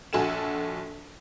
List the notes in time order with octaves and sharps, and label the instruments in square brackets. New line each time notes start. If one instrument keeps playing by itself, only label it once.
[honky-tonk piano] A#1 F#4 A4 G#5 E7